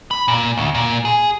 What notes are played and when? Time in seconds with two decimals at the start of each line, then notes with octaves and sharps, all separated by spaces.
0.11 B5
0.28 A#2
0.57 D2
0.75 A#2
1.05 G#4